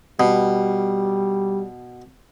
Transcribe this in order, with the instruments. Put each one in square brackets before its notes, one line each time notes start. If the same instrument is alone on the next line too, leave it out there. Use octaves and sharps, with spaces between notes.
[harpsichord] B2 [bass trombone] G3